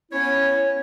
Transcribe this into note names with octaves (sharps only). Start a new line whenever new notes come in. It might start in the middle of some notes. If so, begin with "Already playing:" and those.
B3 C#4 E4 C#5